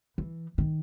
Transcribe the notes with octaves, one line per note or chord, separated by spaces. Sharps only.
E3
D#3